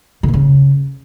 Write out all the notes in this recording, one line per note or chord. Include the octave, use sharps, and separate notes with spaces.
D3
A#2
C#3